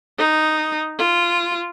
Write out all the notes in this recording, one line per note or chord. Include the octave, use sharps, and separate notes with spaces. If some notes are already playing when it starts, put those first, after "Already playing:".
D#4
F4